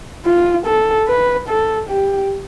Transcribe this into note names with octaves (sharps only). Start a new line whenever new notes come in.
F4
A4
B4
A4
G4